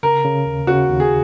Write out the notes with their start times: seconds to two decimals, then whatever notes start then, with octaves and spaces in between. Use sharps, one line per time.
0.03 C#3 A#4
0.24 C#3
0.46 D#2
0.67 C#3 F#4
0.89 D#2
1.00 G#4